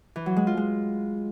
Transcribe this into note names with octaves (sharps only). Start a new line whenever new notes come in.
E3
F#3
G#3
F4
G#3